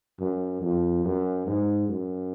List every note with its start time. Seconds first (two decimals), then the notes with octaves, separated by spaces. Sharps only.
0.20 F#2
0.61 F2
1.04 F#2
1.46 G#2
1.88 F#2